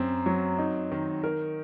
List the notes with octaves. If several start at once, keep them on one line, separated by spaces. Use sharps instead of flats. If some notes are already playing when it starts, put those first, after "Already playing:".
Already playing: F#2 C4
F#3
D#4
D#3
A#4